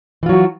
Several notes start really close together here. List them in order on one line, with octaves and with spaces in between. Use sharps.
E3 F4 F#3 F#4